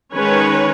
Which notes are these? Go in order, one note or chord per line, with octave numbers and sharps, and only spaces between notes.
D#3 G#3 C#4 B4 C#5